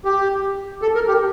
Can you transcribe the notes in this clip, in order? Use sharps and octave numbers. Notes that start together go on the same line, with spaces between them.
G4
A4
A#4
G4